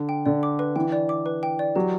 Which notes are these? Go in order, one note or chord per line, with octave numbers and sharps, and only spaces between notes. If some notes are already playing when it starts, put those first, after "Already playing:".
Already playing: D3
G5
D3 D5
D6
B4
E3 G5
D5
D6
B4
G5
D5
F#3 G4